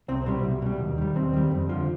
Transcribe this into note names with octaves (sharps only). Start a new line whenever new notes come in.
C2 C4
B2 G3 C4
C2
B2 G3
D#2
D#3 G3
D#2 C4
D#3 G3
F2
D3 F3